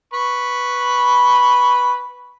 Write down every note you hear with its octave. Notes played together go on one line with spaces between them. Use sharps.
B4 B5 C#6